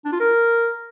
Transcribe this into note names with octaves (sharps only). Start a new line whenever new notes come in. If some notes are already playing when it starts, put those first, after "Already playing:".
D4
F4
A#4